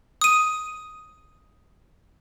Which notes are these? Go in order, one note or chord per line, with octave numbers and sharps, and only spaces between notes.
D#6 D#7